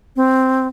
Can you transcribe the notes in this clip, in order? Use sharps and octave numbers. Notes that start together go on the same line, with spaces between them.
C4